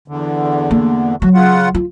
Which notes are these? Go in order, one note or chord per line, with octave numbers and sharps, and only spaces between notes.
E2 D3
A#3
F#3 F#4
C#3 F4 F#5
F4